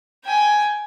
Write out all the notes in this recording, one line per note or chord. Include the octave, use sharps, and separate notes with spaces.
G5 G#5